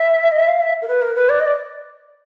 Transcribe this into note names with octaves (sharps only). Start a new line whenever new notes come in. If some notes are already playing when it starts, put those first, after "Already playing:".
Already playing: E5
D#5
E5
F5
E5
A#4
B4
A#4
B4
D5
D#5
D5